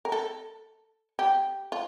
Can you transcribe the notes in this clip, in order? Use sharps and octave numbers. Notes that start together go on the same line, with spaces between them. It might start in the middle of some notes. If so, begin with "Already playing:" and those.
A#4
A4
G4
F4